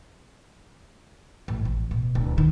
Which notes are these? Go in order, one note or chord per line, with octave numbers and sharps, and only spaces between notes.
A1
A1
B2
D1
D#3